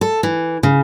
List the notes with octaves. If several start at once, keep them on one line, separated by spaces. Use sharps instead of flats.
A4
E3
C#3